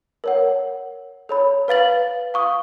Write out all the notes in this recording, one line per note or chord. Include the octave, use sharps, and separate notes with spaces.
A#4 C#5 F#5
A4 C#5 B5
B4 F5 A6 F#7
F5 C#6 D#6